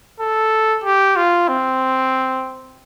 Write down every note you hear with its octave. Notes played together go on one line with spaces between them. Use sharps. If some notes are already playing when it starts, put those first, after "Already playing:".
A4
G4
F4
C4